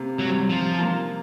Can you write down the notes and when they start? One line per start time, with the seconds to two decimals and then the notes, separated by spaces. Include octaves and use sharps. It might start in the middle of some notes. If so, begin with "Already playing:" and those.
Already playing: C3 A#3
0.18 C3 F#3
0.49 C3 F3
0.80 A#3